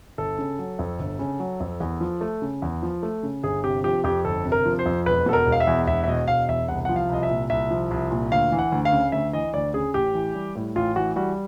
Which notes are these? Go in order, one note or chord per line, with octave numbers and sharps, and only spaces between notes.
G1 A4
C#3
F#3
F2
G1
C#3
F#3
F2
E2
F3
A3
C#3
E2
F3
A3
C#3
G1 G#4
C3 G4
F3 G4
F2 G4
G1 A4
C3
A#4
F3
C5
F2
E1 B4
B2 A4
A#4
E1
F5
E5
E2
E1 E5
E5
B2 D#5
E1 F5
E2 E5
C2 F#5
F#5
F3
F5
C2 D#5
E5
A#2
C2 E5
F3
C2
A#2
D2 F5
E3
F#5
D2
F5
C#3
D2 E5
E3 D#5
D2 D5
C#3 G#4
A1 G4
E3
G3
A2
A1 F4
E3 F#4
G3 F#4